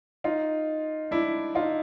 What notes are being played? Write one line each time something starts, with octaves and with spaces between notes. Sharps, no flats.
D#4 F4
D4 E4
D#4 F4